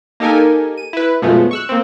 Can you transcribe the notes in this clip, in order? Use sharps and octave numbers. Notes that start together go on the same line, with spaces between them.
A#3 D#4 G4 A4 A#4 G#5
D#7
E4 B4
F#2 B2 F3 G#3 A3 B3
C#6 E6 F#6
A#3 C4